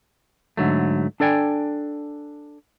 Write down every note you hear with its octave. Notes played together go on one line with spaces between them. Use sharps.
G#2 D3 F#3 A3
D4 A4 D5 G5 G#5